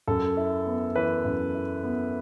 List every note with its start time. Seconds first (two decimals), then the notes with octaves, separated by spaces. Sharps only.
0.08 F#2 A4
0.37 E4
0.66 B3
0.96 E3 B4
1.25 F#2
1.54 E4
1.83 B3